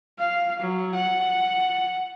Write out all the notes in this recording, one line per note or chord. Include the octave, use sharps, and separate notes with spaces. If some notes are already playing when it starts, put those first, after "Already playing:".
F5
F#3
F#5